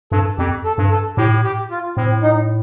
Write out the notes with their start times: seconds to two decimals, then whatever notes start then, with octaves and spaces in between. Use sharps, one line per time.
0.12 G2 A4
0.38 F2 G4
0.64 A4
0.78 G2
0.91 A4
1.17 A2 G4
1.44 G4
1.71 F4
1.97 A2 C4
2.23 D#4